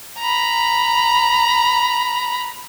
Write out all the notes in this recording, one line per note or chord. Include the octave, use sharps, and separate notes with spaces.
A#5 B5